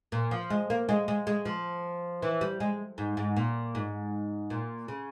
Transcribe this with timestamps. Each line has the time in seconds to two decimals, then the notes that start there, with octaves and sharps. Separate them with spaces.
0.12 A#2
0.31 F3
0.50 G#3
0.70 A#3
0.89 G#3
1.08 G#3
1.27 G#3
1.45 F3
2.22 E3
2.41 G3
2.60 G#3
2.98 G#2
3.17 G#2
3.36 A#2
3.75 G#2
4.50 A#2
4.88 C#3